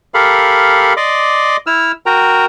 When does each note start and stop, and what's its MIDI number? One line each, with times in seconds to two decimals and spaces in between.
0.14 0.93 67
0.14 0.93 69
0.14 0.93 70
0.14 0.93 77
0.14 0.93 83
0.97 1.57 74
0.97 1.57 75
0.97 1.57 84
0.97 1.57 86
1.67 1.92 64
1.67 1.92 88
1.67 1.92 89
2.06 2.46 66
2.06 2.46 70
2.06 2.46 79
2.06 2.46 82